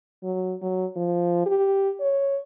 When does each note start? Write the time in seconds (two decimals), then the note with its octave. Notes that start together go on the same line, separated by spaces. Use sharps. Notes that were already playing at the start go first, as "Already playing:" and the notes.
0.23 F#3
0.62 F#3
0.96 F3
1.46 G4
2.00 C#5